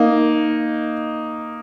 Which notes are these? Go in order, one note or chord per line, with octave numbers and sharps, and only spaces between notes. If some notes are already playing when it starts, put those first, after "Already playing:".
Already playing: A#3 D#4